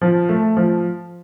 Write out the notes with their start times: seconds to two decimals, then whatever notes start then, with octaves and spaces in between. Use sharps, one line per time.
0.01 F3
0.29 A3
0.57 F3